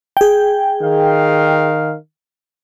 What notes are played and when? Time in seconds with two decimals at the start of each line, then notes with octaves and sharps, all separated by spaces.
0.17 G#4 G5
0.82 D#3 F5